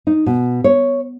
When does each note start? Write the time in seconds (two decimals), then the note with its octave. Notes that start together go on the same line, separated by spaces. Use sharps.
0.07 D#4
0.26 B2
0.64 C#5